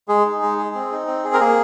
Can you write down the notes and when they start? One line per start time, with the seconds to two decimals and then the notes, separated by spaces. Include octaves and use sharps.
0.08 G#3 G#4
0.26 D#4
0.42 G#3
0.58 G#4
0.75 C4
0.92 D#4
1.07 C4
1.24 G#4
1.33 A#4
1.40 A#3 G#4